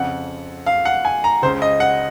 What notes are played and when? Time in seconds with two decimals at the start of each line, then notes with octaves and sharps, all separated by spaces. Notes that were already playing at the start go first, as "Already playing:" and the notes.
Already playing: F2 C#3 F#5
0.66 F5
0.85 F#5
1.05 G#5
1.24 A#5
1.42 C#2 C5
1.47 C#3
1.62 D#5
1.80 F#5